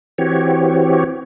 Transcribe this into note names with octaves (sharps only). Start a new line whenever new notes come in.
E3 C4 F#4 G4 C#5